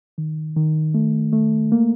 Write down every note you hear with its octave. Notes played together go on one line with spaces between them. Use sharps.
D#3
D#3
A3
A3
A#3